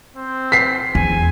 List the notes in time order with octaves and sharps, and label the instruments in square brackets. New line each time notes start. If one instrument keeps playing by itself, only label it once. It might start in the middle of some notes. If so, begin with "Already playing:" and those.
[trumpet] C4
[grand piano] B6 C7
[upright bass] E2 [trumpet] G#5